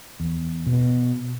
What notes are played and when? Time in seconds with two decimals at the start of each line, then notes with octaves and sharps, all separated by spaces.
0.20 E2
0.67 B2